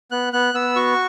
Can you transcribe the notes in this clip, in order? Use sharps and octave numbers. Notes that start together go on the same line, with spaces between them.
B3 F#6
B3 F#6
B3 E6
F#4 C#6